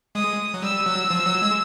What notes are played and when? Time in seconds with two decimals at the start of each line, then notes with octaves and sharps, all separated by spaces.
0.15 G#3 D#6
0.54 F#3
0.62 G3 E6
0.86 F#3
1.10 F3
1.26 F#3
1.42 G#3